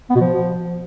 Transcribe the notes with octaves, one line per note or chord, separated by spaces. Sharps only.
B3
B2
F3